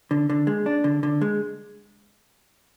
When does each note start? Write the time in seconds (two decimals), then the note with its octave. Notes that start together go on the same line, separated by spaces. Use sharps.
0.11 D3
0.30 D3
0.47 G#3
0.66 D4
0.84 D3
1.03 D3
1.21 G#3